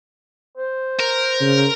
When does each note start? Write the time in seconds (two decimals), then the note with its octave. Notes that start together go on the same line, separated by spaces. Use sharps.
0.58 C5
1.00 A#4
1.41 C#3